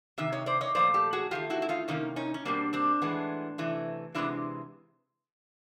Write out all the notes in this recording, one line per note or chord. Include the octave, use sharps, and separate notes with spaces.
C3 D#3 E5
C#5 D#5
C5 D5
C#5 D#5
A#2 F3 A3 C5 D5
G4 A4
F#4 G#4
D#3 F#3 A3 F4 G4
E4 F#4
E4
D#4 F4
C3 D#3 A#3 C#4 D#4
C#4 D#4
C#4
B2 G3 A#3 C4 D4
C4 D4
A2 E3 G#3 B3
C3 E3 A3
C3 E3 G#3 B3 D4 E4